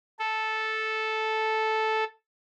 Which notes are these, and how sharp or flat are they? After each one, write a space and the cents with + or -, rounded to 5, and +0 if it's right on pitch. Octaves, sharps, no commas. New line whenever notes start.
A4 -5